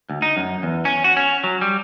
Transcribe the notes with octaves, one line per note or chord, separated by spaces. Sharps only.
D2
D#4
F#2
E2
C#4
F#4
C#4
F#3
G3